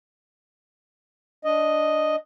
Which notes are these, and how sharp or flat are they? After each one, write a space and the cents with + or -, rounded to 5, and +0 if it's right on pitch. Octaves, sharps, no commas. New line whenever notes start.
D4 -5 D#5 +0